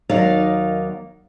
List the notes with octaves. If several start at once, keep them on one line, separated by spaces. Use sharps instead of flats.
D#2 F#3 A#3 D#4 D5 F5